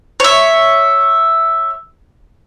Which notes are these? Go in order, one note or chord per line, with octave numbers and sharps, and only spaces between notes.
C#5 E5